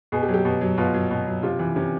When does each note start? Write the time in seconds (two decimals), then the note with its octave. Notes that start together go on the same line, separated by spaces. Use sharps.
0.12 B2 G#4
0.23 G4
0.29 F#3
0.34 G4
0.45 B2
0.61 F#3
0.78 B2 F4
0.94 F#3
1.11 B2
1.27 F#3
1.43 C3 F4
1.59 E3
1.76 C3 C#4